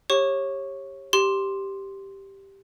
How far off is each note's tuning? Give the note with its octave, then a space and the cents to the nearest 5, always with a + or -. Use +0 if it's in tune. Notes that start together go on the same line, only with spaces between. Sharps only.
G4 +10 C#5 -25 C#6 -5
G4 +0 C6 +5